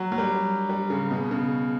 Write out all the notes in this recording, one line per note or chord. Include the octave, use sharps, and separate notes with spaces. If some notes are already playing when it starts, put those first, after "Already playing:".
Already playing: F#3
F#3
G3
G3
C#3
B2
C#3